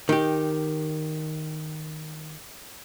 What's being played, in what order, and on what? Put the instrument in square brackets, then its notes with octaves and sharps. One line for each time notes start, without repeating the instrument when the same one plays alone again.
[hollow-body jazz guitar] D#3 G4